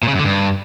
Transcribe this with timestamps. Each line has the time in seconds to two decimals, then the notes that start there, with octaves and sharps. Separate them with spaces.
0.03 A#2
0.08 C#3
0.14 F#2
0.19 D3
0.24 G2